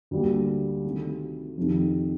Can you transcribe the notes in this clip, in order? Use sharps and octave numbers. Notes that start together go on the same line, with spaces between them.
D2 D3 G3 A#3
C3 D#3 A3
F2 C3 D#3